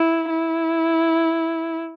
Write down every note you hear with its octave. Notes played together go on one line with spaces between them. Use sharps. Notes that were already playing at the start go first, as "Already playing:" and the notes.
Already playing: E4
E4